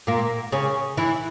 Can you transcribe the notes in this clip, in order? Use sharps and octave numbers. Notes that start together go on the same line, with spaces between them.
A#2 A#3
C#3 C#4
E3 E4